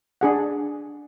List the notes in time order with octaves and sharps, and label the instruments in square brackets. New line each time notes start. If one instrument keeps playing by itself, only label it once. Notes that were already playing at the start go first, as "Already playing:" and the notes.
[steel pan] D4 G#4 F#5